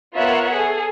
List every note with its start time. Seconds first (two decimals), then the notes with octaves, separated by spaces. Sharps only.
0.15 B3 F4 A#4 C#5 E5 F#5
0.53 G#4 A4